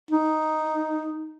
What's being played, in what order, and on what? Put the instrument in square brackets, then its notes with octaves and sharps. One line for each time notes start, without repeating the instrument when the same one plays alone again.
[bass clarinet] D#4